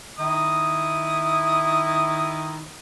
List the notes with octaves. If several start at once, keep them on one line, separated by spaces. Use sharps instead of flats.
D#3 E4 D#6